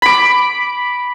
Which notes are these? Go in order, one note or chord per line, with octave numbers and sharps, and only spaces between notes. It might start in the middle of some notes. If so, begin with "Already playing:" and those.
B5 D6